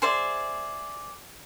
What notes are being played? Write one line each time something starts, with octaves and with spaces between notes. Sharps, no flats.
G#4 C5 D5 E5